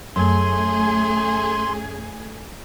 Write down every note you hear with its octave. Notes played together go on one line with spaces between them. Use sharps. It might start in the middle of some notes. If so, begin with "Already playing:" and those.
F#2 A3 G#4 C6